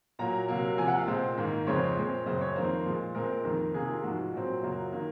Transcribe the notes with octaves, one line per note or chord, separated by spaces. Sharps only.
A#2 F#3 A#3 A#5
C3 F#3 A#3
C3 F3 A#3 G#5
F#5
F5
A#2 G#3 C4
G#2 D#3 A#3
F2 C#3 G#3 C4 C#5
A#2 G#3 C4
F#2 C#3 G#3 C4 C5
C#5
F2 D#3 A#3 C5
A#2 F3 G#3
A#2 G#3 C4 A#4
F2 D#3 A#3
C3 D#3 A#3 G#4
F4
G#2 F3 G#3 F#4
A#2 F#3 C4
F#2 C#3 F#3 A#3 F4
D#3 A#3